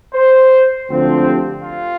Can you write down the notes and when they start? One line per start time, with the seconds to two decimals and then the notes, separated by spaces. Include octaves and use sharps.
0.14 C5
0.88 D2 D3 F3 C4
1.25 G4
1.62 F4